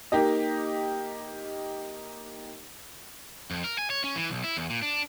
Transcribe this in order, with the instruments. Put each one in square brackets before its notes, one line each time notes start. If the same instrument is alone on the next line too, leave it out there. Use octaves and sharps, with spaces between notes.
[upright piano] A#3 D#4 G4 D#5
[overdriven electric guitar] F2
A#4
G#5
C#5
C#4
E3
B1
E4
E2
A#2
D4